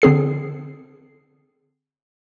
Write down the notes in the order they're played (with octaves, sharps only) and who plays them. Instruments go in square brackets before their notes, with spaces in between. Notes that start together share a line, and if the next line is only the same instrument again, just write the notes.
[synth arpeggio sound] D3 C4 G#4 C7